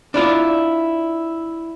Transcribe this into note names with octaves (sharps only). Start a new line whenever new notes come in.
D4 E4 F4 D5